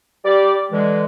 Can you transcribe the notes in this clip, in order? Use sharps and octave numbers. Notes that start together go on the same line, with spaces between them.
G3 G4 D5
D3 E3 G#3